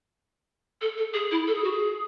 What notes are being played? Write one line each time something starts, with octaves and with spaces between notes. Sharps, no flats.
A4
A4
G#4
E4
A4
G#4
F#4
G#4